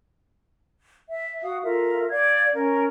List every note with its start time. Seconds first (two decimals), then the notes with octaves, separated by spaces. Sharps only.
1.09 E5
1.42 F#4 F5 D#6
1.64 F4 A4 A#4 E5
2.09 D5 F5 G#6
2.54 C#4 A#4